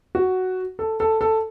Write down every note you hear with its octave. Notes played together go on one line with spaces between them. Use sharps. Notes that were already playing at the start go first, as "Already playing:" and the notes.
F#4
A4
A4
A4